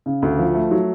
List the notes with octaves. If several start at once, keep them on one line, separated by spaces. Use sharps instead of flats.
C#3
D2
F3
A3
F#3